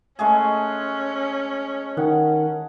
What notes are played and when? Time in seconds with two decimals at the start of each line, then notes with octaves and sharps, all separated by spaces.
0.19 G#3 A3 C#4 G#4
1.97 D#3 F#5